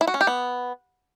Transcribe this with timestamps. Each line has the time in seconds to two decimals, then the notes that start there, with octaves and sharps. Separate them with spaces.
0.01 E4
0.07 F#4
0.14 C#4
0.21 G4
0.27 B3